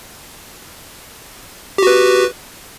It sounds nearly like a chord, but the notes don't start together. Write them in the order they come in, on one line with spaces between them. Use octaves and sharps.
G4 F#4 B4